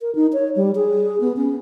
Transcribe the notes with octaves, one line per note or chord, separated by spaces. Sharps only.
A#4
D#4
C#5
G3
G#4
B3
C#4